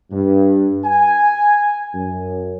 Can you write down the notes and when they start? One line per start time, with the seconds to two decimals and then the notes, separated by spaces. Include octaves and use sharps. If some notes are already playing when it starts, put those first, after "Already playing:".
0.11 G2
0.85 G#5
1.94 F#2